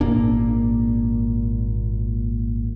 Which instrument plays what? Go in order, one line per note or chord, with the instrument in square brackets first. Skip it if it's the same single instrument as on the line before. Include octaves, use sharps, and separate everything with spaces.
[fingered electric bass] G#1 A#2 A#3 D4